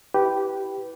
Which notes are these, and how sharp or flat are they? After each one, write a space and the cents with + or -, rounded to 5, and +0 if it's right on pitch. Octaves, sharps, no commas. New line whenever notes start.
E4 -10 G4 -10 B4 +0